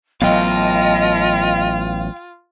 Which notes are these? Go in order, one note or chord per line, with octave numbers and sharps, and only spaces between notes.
A1 F#3 B3 F4 D#5 F5 G5